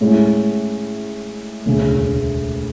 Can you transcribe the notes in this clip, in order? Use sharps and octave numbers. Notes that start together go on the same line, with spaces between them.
A2 G#3 C#4 E4
E1 D2 C#3